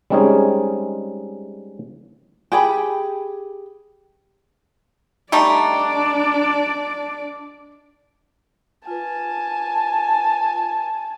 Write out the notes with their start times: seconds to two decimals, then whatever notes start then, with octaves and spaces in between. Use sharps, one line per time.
0.10 G3 G#3 C4 C#4 D#4 G#4
2.52 G4 G#4 G5 B5
5.32 G3 A3 D4 D#4 D5
8.87 F4 B4 G#5 A5